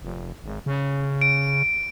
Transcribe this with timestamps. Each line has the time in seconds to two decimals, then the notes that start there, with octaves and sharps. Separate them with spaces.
0.02 F1
0.44 G#1
0.66 C#3
1.21 D7